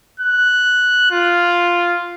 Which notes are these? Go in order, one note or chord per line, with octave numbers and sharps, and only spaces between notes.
F#6
F4